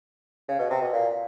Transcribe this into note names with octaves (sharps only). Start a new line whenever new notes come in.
C#3
B2
C3
B2
A#2